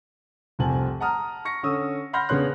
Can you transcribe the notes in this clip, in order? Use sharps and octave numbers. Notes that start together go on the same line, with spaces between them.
F1 C2 C4 G#5 A5 F#7
F#5 A5 A#5 D#6 F6
C#6 A#6 C#7
D3 C#4 C#6 D#6 E6
F#5 B5 C6 F6 G6 A#6
C#3 B3 D4 C#5 C6 F#6